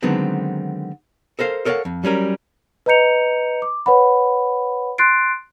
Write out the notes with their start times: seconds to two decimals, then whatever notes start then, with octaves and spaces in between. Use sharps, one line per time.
0.03 D3 D#3 F#3 G#3 B3 C4
1.39 A4 A#4 C5 F5
1.65 A4 A#4 C#5 D#5 F5 F#5
1.85 F2
2.04 F#3 G3 C#4 A#4
2.86 B4 D#5 A#5 G6 C#7 F7
3.62 D6
3.86 B4 C#5 F#5 B5
4.98 C6 F#6 A6 C7 D7